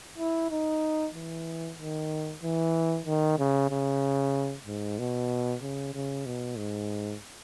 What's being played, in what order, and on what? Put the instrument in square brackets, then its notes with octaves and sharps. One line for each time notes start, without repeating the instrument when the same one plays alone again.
[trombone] E4
D#4
E3
D#3
E3
D#3
C#3
C#3
G#2
B2
C#3
C#3
B2
G#2